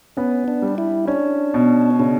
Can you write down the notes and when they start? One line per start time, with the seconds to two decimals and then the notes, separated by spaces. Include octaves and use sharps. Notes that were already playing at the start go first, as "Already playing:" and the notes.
0.17 B3 C#4
0.48 D4
0.62 G3
0.78 E4
1.07 C#4 D4
1.54 B2
1.99 C#3 D4